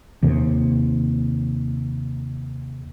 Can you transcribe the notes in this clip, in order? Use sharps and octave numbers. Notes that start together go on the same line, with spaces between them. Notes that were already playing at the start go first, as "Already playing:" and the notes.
D#2 C3